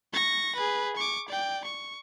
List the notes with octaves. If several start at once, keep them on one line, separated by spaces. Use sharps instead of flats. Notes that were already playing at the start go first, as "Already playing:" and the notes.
C#6 A#6
G#4 B4
C#6 D6
D5 G5
C#6